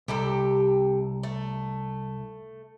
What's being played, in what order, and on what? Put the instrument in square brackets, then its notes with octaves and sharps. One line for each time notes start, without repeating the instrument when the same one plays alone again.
[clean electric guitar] C2 [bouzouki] C3 G4 A4
[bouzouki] A3